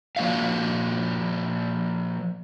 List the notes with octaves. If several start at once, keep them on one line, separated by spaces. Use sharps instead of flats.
F3 A#3 C#4 F#4 D5 F5